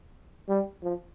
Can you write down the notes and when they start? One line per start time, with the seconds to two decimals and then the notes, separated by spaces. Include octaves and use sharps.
0.49 G3
0.83 F3